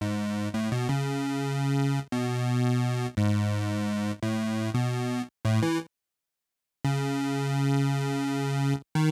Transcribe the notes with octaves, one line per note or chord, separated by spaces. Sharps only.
G#2
A2
B2
C#3
B2
G#2
A2
B2
A2
E3
C#3
D#3